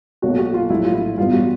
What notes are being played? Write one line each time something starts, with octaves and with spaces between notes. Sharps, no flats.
B1 A#2 F#3 A3 F#4
F#4
F4
A#1 A2 F#3 E4
F4
E4
G2 E3 G3 B3 F4
F#4